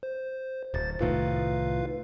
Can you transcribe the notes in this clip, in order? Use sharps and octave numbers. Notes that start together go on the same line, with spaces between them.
C5
D1 C5 A6
C2 A2 D#3 F4 B4 F5